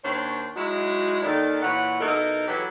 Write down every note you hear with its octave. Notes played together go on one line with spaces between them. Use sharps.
D#2 D4 C5 C#5
F#3 G#3 D#4 E4 F#4
D#2 D#3 D#4 A4 A#4 D5
A#2 E3 C#5 F#5
B2 D#4 E4 A4 A#4 D#5
E3 F#3 G4 A4 B4 C#5